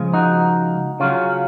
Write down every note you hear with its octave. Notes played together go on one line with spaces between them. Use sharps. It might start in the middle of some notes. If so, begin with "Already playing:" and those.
Already playing: C#3 F3 G#3
D#4 F#4
C#3 F#3 C#4 F4